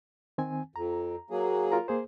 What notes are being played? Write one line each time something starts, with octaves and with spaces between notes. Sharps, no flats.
D#3 C4 G#5
F2 A#5
F#3 A#3 G#4
F4 A#4 A#5
A#3 G#4 C5